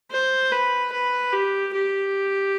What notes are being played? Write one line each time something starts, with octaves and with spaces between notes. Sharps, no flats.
C5
B4
B4
G4
G4